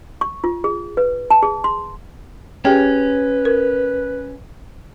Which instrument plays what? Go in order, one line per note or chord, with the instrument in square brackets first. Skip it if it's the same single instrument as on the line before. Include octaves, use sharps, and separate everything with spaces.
[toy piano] C#6
F4
G#4
B4
A5
G#4
C6
[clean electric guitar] C#4 [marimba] G4 G#4 G5 [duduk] B4
[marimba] A#4